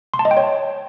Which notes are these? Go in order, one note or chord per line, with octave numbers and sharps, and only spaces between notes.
C6
A5
D#5
G5
C#5